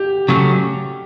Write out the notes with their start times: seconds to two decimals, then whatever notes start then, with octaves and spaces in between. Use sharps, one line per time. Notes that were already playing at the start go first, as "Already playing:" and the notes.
Already playing: G4
0.29 C#3 F#3 A3 C#4